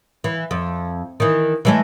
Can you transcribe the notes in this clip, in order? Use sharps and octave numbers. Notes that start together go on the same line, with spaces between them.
E3
F2
D#3 E3
E3 G#3 A3